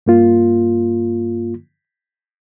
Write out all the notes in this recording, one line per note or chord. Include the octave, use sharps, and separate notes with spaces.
G2 A#3 F4